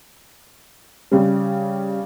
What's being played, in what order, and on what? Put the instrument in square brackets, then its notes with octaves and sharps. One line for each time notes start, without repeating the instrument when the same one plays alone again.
[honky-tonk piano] C#3 G3